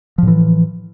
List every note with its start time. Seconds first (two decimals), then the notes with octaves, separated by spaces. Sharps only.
0.18 F3
0.23 A2
0.27 E3